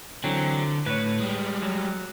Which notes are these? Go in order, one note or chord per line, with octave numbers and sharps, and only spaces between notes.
D3 E3 F#3 C4
A2 B4 C#5
G3 G#3
F#3